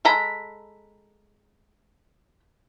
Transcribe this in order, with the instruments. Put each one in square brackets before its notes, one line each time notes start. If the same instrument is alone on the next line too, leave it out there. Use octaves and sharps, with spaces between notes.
[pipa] G#3 A4 A#5 B5